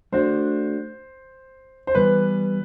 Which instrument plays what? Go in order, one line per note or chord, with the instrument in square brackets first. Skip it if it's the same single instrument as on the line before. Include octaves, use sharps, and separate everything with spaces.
[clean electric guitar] A3 D4 F#4 [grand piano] C5
[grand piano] C5
[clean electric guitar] E3 G3 B3 [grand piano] B4